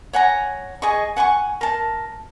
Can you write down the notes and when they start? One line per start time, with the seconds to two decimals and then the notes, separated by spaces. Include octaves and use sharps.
0.13 C#5 F#5 G#5 A#5
0.82 G#4 D#5 C#6
1.16 F#5 G#5 A5 C#6
1.61 A#4 A5